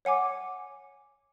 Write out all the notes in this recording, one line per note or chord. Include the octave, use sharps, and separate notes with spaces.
C#5 F#5 G#5 D6